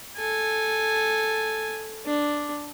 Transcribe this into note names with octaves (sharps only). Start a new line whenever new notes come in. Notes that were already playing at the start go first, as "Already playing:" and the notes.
A4 G#5
D4